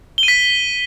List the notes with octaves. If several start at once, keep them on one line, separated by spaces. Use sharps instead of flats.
G7
D#7
B6